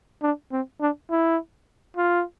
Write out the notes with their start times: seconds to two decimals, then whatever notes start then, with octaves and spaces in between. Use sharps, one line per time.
0.22 D4
0.52 C4
0.80 D4
1.11 E4
1.97 F4